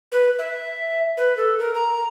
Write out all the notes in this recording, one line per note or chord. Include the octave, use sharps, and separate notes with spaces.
B4
E5
B4
A4
A#4
A#5